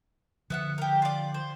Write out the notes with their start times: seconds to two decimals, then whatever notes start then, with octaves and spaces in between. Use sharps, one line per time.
0.50 D3 F3 B3 E5 F#5
0.78 G4 A#4
1.02 F4 D5
1.34 C5